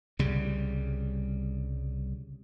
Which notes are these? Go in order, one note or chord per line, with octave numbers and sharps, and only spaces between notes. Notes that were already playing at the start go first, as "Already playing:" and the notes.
C2 C#3 G3